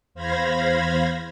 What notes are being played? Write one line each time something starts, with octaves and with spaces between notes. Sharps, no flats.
E2 C5 F5 B5 G#6 A#6